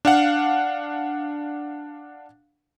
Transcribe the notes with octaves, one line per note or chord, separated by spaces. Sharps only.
D4 F5 F#5